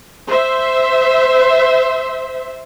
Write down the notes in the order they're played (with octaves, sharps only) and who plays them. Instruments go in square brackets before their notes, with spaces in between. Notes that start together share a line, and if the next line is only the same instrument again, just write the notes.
[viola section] C5 E5